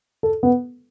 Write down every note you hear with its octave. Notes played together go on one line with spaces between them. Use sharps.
A4
B3